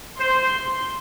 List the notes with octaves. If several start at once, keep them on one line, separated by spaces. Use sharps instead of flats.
C5 C6